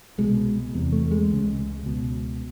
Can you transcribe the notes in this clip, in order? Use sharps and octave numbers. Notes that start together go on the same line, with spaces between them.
C2 B2 G#3
E2 C3
A3
G#3
C#2 C#3
C#2 B2